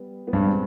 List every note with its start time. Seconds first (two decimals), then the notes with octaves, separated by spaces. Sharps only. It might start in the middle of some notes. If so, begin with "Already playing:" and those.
Already playing: G3 B3
0.27 B3
0.33 G2 G#3 C4